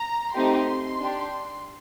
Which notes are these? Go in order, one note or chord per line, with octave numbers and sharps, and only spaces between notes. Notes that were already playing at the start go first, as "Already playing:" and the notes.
Already playing: A#5
A3 C4 D#4 G4 C6
D4 G4